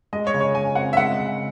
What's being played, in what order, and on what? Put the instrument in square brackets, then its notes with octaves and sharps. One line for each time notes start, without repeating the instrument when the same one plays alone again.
[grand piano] G#3 [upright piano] D#5
[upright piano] C#5
[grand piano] C#3
[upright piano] C#5
[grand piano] C#3 [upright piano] G#5
[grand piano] C4 [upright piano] F#5
[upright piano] E5
[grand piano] G#3 [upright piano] F#5
[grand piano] C#3